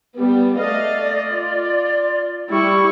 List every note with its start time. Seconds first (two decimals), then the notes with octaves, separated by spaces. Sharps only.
0.15 G3 B3
0.56 A3 D5 D#5 F5
1.32 F4
2.50 G3 E4 C#6